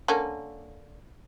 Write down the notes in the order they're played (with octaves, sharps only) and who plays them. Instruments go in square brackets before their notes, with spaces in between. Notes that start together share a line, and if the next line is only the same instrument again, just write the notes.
[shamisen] D3 A#3 C#4